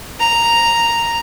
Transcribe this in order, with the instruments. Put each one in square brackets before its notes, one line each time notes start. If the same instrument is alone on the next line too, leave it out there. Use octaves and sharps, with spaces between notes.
[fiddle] A#5